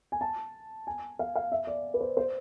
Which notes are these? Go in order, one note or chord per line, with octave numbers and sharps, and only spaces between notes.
G#5
A5
G#5
F5
F5
E5
D5
B4
C5
C5